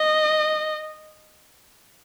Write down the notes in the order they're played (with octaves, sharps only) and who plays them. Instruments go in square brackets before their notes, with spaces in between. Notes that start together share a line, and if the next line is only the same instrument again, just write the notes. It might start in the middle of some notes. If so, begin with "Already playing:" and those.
Already playing: [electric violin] D#5